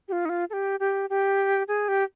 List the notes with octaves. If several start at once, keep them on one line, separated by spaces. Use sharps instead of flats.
G4
F4
D#4
F4
A4
G4
G4
G4
G#4
G4